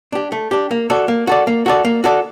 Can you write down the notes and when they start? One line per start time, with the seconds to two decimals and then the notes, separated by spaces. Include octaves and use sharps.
0.12 D4 G4
0.32 A3
0.51 D4 G4
0.71 A#3
0.90 F#4 A4 D5
1.08 A#3
1.27 F#4 A4 D5
1.47 A#3
1.66 F#4 A4 D5
1.85 A#3
2.04 F#4 A4 D5